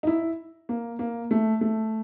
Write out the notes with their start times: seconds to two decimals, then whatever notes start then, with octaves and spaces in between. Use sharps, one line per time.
0.03 D#4
0.07 E4
0.69 A#3
0.99 A#3
1.31 A3
1.61 A3